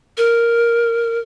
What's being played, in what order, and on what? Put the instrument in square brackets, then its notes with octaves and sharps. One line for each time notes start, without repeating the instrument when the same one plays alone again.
[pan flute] A#4